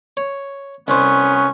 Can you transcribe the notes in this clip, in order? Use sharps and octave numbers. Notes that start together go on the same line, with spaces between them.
C#5
C2 B3 C#4 C5 C#6